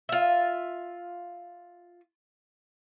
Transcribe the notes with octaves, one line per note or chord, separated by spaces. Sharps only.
F4 E5